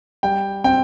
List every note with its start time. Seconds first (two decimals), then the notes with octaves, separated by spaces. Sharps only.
0.23 G3 G5
0.64 C4 G5